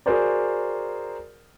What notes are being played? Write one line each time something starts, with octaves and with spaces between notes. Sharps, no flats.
F#4 G#4 A#4 C5 D5